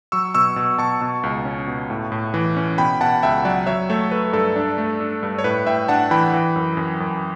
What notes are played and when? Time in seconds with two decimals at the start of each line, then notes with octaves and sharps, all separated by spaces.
0.12 F#3 C#6 E6
0.34 B2 C#6 E6
0.56 B2
0.78 B2 A5 C#6
1.01 B2
1.23 C#2
1.45 C#4
1.67 B2
1.90 A2
2.12 A2
2.34 E3
2.57 C#4
2.78 B2 G5 B5
3.01 B2 F#5 A5
3.23 C#2 E5 G5
3.45 F#3 D5 F#5
3.66 F#3 C#5 E5
3.90 A3 A4 C#5
4.11 A3 B4
4.33 G2 A4
4.56 D4
4.78 A3
5.00 D4
5.23 G2
5.39 C#5
5.44 A2 B4
5.67 A2 E5 G5
5.88 D4 F#5 A5
6.11 E3 G5 B5
6.33 E3
6.56 F#2
6.77 F#2
7.00 F#2